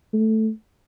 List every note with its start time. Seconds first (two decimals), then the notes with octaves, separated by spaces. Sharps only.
0.13 A3